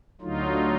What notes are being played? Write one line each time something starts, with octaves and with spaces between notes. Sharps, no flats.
D2 D3 F#3 D#4 F4